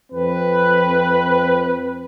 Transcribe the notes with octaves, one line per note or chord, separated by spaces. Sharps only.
F2 C4 B4